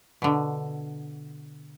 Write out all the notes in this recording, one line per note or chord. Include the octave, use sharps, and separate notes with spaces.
B2 D3